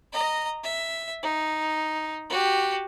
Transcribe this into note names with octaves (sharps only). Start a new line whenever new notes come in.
D#5 A#5
E5
D#4
F#4 G4